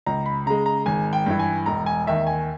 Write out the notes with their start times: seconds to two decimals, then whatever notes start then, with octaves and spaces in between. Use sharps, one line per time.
0.06 C#2 A#5
0.26 B5
0.46 C#3 G#3 A#5
0.66 A#5
0.86 G#1 G#5
1.13 G5
1.26 G2 E3
1.39 G#5
1.66 E1 A#5
1.86 G#5
2.07 D#2 D#3 E5
2.27 G#5